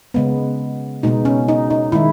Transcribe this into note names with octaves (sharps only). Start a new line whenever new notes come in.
C#3 G#3 B3
B2 G#3 B3 D#4
C#4
D#4
D#4
D#3 G#3 E4